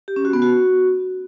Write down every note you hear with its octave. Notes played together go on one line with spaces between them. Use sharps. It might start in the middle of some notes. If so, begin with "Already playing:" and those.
G4
C#4
F#4
B3
F#4